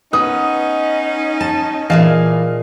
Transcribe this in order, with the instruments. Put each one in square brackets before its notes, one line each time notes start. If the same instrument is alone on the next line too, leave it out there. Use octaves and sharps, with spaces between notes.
[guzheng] B3 [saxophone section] C#4 D#4 [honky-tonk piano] D#6
[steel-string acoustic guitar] A5
[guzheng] A#2 G#4 A5 [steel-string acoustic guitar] E3 [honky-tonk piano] D#5 F5